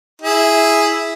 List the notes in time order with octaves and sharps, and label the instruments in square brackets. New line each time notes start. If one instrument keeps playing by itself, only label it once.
[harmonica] E4 G#4